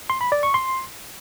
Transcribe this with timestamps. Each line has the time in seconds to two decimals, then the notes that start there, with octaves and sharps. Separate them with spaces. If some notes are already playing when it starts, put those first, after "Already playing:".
0.10 C6
0.21 B5
0.32 D5
0.43 C#6
0.54 C6